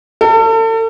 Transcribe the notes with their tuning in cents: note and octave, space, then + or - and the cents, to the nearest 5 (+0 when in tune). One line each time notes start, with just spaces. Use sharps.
A4 +40